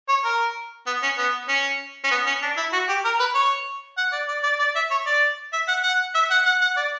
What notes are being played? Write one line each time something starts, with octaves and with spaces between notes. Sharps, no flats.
C#5
A#4
B3
C#4
B3
C#4
C#4
B3
C#4
D4
E4
F#4
G4
A#4
B4
C#5
F#5
D5
D5
D5
D5
E5
C#5
D5
E5
F#5
F#5
E5
F#5
F#5
F#5
D5